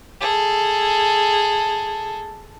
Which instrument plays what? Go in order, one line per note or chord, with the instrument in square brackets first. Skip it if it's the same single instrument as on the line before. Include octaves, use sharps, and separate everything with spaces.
[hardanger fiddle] G#4 A4